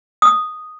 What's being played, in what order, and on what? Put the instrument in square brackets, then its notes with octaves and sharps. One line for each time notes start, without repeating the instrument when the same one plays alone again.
[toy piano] D#6